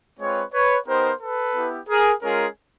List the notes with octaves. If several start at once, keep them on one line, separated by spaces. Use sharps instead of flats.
G#3 C4 F4 B4 C#5
B4 C#5
B3 D#4 G4 A#4 C5
A4 B4
B3 E4 G4
G#4 A#4
G#3 C#4 F4 G#4 A#4